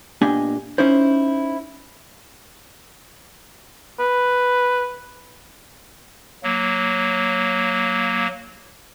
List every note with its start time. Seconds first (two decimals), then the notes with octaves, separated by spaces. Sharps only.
0.21 A#2 B3 D4 G4 D#5 G#5
0.78 C#4 D#4 E4 C5
4.00 B4
6.43 F#3 A#3